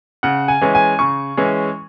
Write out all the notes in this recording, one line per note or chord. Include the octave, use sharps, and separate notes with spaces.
C#3 F#5
G#5
E3 G#3 C#4
G#5
C#3 C#6
E3 G#3 C#4